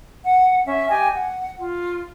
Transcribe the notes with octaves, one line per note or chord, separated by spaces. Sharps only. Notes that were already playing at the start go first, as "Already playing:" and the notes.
F#5
C#4 E5
G4 D#5 G5 G#5
F#5
F4